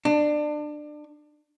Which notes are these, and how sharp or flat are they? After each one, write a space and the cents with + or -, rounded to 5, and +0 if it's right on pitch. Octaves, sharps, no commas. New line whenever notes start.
D4 +25